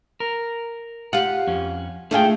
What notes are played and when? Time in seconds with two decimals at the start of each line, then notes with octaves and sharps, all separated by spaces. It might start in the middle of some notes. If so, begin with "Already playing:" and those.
0.20 A#4
1.13 F4 G4 F#5
1.47 F2 C#4
2.11 A3 D4 F4 G#4 G5